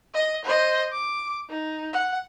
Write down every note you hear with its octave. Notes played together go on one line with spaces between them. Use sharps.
D#5
C5 D#5
D6
D#4
F#5